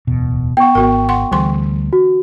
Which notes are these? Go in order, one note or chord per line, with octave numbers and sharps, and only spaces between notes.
D1 E2 B2
B3 F#5 G5 C#6
G#1 B3 F#4 A#4
F#5 C6
D2 D3 E3 G3 C6
F#4